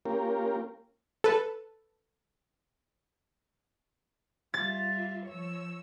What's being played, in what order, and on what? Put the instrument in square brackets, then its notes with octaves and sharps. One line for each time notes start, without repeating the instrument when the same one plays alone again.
[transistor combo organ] A#3 C#4 F4 G4 A#4
[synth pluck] A4 B4
[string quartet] G3 F4 E5 [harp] A6
[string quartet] F3 C#5 E6